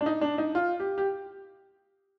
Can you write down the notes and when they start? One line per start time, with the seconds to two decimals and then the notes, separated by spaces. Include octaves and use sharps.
0.01 D4
0.06 D#4
0.21 D4
0.38 D#4
0.55 F4
0.80 G4
0.98 G4